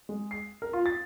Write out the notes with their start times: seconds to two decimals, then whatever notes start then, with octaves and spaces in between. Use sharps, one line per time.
0.09 G#3
0.31 C7
0.62 A#4
0.73 F4
0.86 A6